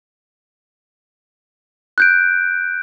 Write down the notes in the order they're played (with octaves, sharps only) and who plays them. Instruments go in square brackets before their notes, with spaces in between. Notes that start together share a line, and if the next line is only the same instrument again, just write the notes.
[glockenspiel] F#6 G6 D7